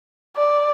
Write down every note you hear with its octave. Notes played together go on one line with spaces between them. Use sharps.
D5